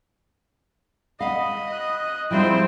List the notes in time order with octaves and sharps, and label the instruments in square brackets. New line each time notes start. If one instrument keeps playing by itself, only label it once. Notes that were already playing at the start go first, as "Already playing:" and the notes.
[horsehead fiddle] D#5 [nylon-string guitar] F5 F#5 [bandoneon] B5
[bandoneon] F#6
[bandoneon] G#2 E4 G5 [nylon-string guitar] F3 G3 F4 [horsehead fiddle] C4 C5